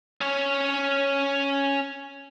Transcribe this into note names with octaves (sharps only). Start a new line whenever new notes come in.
C#4 C#5